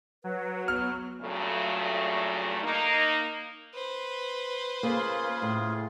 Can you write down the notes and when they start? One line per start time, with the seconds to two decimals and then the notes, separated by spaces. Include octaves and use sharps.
0.24 F#3 B4
0.68 B3 F6
1.22 G2 A#2 C#3 F#3 A3
2.64 A#3 D#4
3.74 B4 C5
4.83 C#3 A#3 F4 G#4
5.42 A2